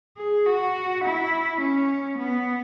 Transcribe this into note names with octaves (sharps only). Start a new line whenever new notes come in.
G#4
F#4
E4
C#4
B3